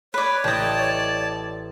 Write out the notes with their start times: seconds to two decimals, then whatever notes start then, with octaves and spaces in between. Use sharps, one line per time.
0.14 B4 C#5 D5
0.44 A1 D5 D#5 G5 A5